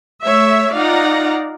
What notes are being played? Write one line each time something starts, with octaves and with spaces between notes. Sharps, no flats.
A3 C#5 E5
D#4 F4 D5 F5 F#5 A#5